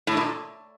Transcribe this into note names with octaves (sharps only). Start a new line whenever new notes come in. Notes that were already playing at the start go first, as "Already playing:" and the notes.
A2
A#2